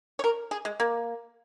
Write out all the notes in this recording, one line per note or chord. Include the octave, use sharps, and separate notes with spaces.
C#5
A#4
G#4
G#3
A#3